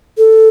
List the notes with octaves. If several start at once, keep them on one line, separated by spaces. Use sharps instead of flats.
A4